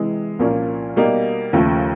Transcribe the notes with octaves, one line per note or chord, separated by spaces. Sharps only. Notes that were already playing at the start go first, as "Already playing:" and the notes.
Already playing: C3 E3 G#3
C2 A#2 F3 A#3 C#4
B2 G3 A#3 D#4
D#2 C#3 F3 A3